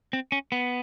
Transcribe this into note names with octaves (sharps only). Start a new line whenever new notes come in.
C4
C#4
B3